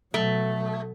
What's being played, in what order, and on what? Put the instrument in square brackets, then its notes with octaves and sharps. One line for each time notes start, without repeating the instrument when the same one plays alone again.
[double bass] B2 F#3 [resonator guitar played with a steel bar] A3